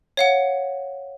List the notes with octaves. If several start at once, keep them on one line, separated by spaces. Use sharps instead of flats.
C#5 F5 F#5